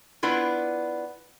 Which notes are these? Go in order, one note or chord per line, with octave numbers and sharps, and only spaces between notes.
B3 D4 E4 F4